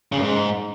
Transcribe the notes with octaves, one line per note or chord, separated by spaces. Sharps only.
C#3
F#2
G#2